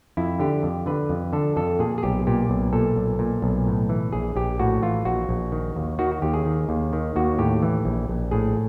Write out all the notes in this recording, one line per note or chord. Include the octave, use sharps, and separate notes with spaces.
F2 E4
D3 G4
F2
D3 B4
F2
D3 A4
F2 A4
A#2 G#4
G#4
B1 G4
A#2 G4
B1
A#2 A4
B1
A#2
B1
A2
E3
A#1 G#4
A#1 G4
A2 F#4
E3 F4
A#1 F#4
A#1
D#3
D#2
D#3 F#4
D#2 G4
G#4
D#3
D#2
D#3
D#2 F#4
A2 G4
E3
A#1
A#1
A2 G#4